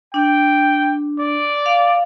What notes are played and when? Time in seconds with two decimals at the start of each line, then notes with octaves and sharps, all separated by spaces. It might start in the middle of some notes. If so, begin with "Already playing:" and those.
0.14 D4 G5
1.19 D5
1.66 F5